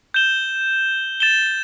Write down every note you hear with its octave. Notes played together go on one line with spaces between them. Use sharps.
G6 E7 G7
A6 E7 G7